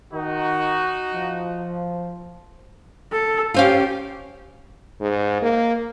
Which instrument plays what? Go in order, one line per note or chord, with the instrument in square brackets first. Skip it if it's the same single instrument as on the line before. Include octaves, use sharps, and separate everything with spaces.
[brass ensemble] D#3 [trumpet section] D#4 F#4
[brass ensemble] F3
[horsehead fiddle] A4
[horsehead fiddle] C#4 G4 [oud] F4 C5 F5
[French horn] G#2
A#3